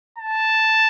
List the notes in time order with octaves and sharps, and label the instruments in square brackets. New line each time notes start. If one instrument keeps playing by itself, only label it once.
[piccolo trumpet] A5